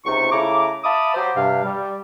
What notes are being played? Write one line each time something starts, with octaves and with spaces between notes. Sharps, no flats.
C#2 C3 D#4 C#6
C#3 A3 E4 A#5 D6
E5 F5 A5 B5 D6 D#6
F#3 G4 C5
G2 C3 F5
G3